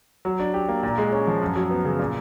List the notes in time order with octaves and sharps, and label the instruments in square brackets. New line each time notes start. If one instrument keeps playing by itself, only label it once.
[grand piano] F#3
D4
G4
A#3
A#2
G#3
C#4
F3
F#2
F#3
B3
C#3
A#2